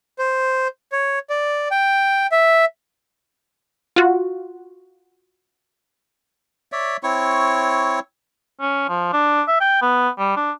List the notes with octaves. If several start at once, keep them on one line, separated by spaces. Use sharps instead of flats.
C5
C#5
D5
G5
E5
F4 F#4
C#5 D5 E5
C4 E4 C#5 C#6
C#4
F3
D4
E5
G5
B3
G3
D4